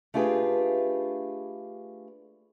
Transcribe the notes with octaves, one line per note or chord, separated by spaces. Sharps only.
A3 D4 F4 G4 G#4 B4